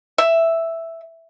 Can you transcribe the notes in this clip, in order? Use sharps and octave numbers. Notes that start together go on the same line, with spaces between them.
E5